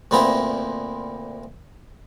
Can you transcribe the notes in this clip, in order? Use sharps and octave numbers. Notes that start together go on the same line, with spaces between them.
D2 A#2 B3 C4 E4 A#5